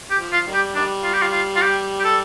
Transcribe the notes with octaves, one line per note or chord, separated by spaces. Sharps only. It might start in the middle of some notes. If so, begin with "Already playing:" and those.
G4
F3
F4
D#3 G3
G4
D#3 G3 D4
F4
G4
F4
F4
F4
G4
G4
A4